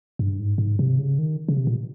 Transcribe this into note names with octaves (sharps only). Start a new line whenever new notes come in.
G2
G#2
G#2
C3
C#3
D#3
C#3
C3
A#2